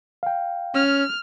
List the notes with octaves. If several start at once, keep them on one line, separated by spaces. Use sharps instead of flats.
F5 G5
C#4 F6